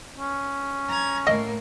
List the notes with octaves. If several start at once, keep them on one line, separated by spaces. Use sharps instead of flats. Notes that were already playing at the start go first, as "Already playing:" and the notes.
C#4
A#5 G#6
A2 A#3 D#5